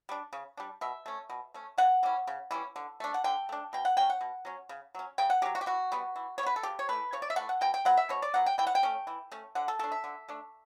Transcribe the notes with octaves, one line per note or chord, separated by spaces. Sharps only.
G3 D4
C#3
G3 D4
B2 E5
A3 C#4
B2
A3 C#4
C#3 F#5
E3 G3 C#4
C#3
E3 G3 C#4
D3
A3 D4
F#5
D3 G5
A3 D4
B2 G5
F#5
F#3 C#4 G5
F#5
B2
F#3 C#4
C#3
F#3 C#4
C#3 G5
F#5
F#3 C#4 G4
F#4
G4
E3 F#4
G3 B3
E3
G3 C#5
B3 B4
A4
C#3 G4
C#5
E3 A3 B4
C#3 C#5
D5
E5
E3 A3 F#5
F#5
B2 G5
G5
F#3 B3 F#5
E5
B2 C#5
D5
F#3 B3 F#5
G5
E3 G5
F#5
G5
A3 C#4
E3
A3 C#4
D3 F#5
A4
A3 D4 A4
E5
D3
A3 D4